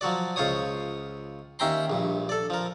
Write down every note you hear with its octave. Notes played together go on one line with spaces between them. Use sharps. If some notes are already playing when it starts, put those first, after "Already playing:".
F3 F#3 F#4 D5
C#2 F4 C5 C#5 D#6
D#2 C#4 E5 G5 A#5 C6
A#1 G2
A4 D5
F3 A#4